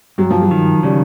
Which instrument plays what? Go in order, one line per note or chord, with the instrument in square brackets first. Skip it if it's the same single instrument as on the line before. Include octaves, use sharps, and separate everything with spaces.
[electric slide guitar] G2 [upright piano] F#3
[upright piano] F3
F#3
[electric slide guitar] D#3
[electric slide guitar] C#3 [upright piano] G3